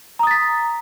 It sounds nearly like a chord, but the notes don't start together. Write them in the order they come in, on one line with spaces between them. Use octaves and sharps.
A#5 D#6 A6 B6